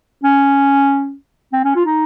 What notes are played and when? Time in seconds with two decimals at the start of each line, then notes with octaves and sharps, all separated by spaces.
0.23 C#4
1.53 C4
1.64 C#4
1.75 F4
1.85 D#4